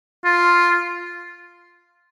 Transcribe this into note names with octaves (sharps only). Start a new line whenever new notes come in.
F4